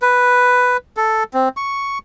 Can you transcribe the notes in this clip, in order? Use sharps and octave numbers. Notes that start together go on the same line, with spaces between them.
B4
A4
C4
C#6